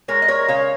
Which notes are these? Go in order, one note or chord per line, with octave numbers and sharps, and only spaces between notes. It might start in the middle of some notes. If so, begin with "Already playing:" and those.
G#3 A#4 C#5
D#5
A#4 C#5
C#3 C#5 F5